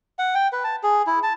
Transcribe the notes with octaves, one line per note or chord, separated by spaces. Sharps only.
F#5
G5
B4
A5
G#4
E4
A5